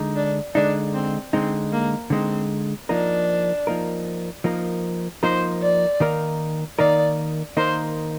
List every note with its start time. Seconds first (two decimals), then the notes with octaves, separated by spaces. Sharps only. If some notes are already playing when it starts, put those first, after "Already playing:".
Already playing: D3 G#3 D#4
0.16 D4
0.54 D3 G#3 D4 D#4
0.94 C4
1.32 D3 G#3 C4 D#4
1.72 A#3
2.10 D3 G#3 C4 D#4
2.89 F3 A#3 D4 D#4 A#4
3.67 F3 A#3 D#4 A#4
4.44 F3 A#3 D#4 A#4
5.23 F3 A#3 D#4 A#4 C5
5.62 D5
6.00 D#3 A#3 D#4 A#4
6.78 D#3 A#3 D#4 A#4 D5
7.57 D#3 A#3 D#4 A#4 C5